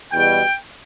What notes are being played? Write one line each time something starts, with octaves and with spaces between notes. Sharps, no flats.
E2 B2 G3 G5